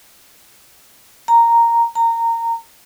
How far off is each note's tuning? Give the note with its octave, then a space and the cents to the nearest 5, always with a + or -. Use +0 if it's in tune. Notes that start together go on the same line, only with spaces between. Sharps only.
A#5 -5
A#5 -20